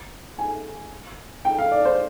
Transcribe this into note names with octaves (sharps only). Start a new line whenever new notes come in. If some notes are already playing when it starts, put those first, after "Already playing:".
G#5
G5
F5
D5
C5